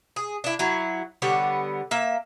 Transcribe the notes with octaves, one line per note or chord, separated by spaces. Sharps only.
G#4
D4 E4
F#3 E4
D3 G3 B3 C#5
A#3 E5